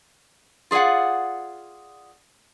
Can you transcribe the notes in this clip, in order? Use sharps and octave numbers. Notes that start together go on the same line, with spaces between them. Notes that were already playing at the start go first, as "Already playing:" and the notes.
F4 G#4 D5 F5 F#5